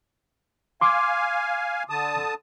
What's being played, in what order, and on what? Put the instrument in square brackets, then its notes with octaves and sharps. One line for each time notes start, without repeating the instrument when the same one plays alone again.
[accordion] F5 G#5 [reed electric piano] C6 D6
[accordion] D3 A5 D#6